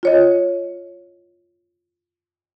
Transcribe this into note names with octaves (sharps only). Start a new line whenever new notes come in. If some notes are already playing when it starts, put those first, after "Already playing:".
F4 C#5 D#5